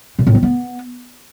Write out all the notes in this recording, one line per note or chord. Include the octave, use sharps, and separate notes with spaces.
A#2
A2
C4
B3